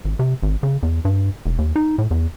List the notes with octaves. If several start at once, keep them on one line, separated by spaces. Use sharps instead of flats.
G#1
C3
G#1
C#3
E2
G2
E1
D#2
D#4
A2
E2